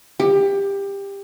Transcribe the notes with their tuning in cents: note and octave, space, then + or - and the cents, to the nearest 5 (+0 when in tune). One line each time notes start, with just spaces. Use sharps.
G4 +20